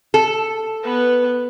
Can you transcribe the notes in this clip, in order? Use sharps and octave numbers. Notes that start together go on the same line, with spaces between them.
A4
B3 B4